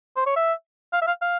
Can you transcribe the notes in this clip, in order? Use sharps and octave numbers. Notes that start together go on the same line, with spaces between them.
C5
C#5
E5
F5
E5
F5
F5